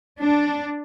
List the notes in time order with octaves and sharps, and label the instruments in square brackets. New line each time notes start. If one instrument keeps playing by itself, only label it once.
[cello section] D4